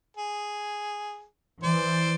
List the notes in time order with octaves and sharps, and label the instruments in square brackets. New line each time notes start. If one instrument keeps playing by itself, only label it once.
[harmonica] G#4
[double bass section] E3 [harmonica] C5 D5